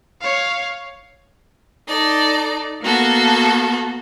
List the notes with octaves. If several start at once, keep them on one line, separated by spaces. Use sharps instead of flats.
C#5 F5
D#4 A4 D5
A#3 B3 F#4 A4